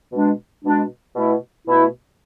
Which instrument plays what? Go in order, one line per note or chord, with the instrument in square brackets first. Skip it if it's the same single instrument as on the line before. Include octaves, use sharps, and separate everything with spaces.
[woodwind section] B2 G#3 D4
B2 G#3 D4
B2 A3 E4
B2 A3 E4